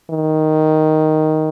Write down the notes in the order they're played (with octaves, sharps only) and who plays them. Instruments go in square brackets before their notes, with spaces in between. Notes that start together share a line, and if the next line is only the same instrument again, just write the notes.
[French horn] D#3